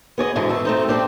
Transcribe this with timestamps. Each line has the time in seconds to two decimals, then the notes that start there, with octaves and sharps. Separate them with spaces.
0.18 B3 G#4 D5 D#5
0.36 G#2 B2 D3 E3
0.49 A3 A4
0.65 A3 C4 D#4
0.88 F3 C4 D4 G4